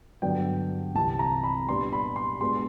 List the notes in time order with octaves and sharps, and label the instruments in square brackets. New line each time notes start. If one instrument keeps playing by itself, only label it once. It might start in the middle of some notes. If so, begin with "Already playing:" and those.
[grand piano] G2 D3 F#3 B3 D4 G5
C2 C3 E3 A5
A#5
B5
A#2 G3 B3 D4 C6
B5
C6
B2 G#3 B3 D4 C6